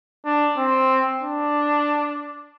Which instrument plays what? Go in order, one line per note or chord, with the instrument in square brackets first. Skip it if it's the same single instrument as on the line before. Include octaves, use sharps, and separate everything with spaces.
[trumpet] D4
C4
D4